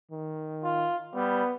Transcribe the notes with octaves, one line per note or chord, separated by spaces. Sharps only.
D#3
F4
G3 B3